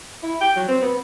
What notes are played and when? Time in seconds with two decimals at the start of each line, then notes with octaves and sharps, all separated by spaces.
0.23 E4
0.41 G5
0.56 F#3
0.68 C4
0.82 B3